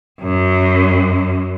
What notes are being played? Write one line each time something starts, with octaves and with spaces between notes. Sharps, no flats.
F#2